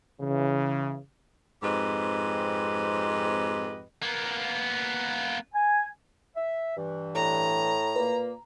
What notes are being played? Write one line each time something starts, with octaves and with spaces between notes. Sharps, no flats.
C#3 E3
F2 G#2 C4 G4 B4 D#5
A#3 B3
G#5
E5
G2 E3
A2 A#5
A#2 A#3 B4